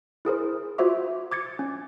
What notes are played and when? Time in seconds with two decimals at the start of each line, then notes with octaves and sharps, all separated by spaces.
0.25 E4 G#4 A#4 C5
0.78 F4 F#4 C5 E5 D6
1.32 D6 G#6 A6 C#7
1.59 C#4